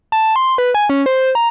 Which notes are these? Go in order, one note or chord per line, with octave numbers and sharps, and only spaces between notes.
A5
C6
B4
G#5
C#4
C5
A#5